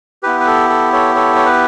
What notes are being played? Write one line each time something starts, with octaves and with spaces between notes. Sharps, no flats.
B3 E4 G4 B4
B4
A4
A4
A4 C#5
A4 C#5
C#5
B4